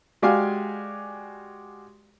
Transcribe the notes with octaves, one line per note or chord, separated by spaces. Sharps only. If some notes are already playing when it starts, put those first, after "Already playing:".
G#3 F#4 G4 D5 F5 G#5